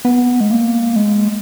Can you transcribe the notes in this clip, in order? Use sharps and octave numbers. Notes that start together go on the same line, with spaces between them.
B3
G#3
A#3
G#3